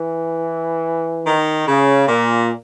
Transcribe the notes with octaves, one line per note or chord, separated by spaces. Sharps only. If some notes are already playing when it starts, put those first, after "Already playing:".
Already playing: E3
D#3
C#3
A#2